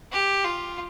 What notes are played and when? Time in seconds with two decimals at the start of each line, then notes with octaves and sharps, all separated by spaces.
0.12 G4
0.45 F4